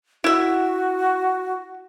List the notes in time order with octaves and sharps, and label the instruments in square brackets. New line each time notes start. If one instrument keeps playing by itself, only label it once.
[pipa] E4 E5 [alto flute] F#4